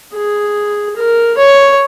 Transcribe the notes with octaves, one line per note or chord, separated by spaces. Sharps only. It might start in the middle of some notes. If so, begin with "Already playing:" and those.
G#4
A#4
C#5